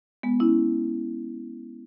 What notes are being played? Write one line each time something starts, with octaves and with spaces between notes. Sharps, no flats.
G#3 B3
C#4 E4